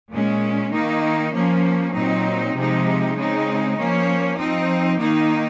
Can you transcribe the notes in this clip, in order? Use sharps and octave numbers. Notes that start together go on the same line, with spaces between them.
A#2 G#3 C#4
D#3 A#3 D#4
F3 A#3 C#4
A#2 F#3 C4 D#4
C3 F3 G#3 D#4
C#3 G#3 C4 D#4
F3 A#3 C#4
F3 C4 D#4
D#3 A#3 D#4